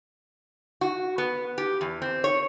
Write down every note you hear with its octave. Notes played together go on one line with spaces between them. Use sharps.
F#4
B3
G4
E2
C4
C#5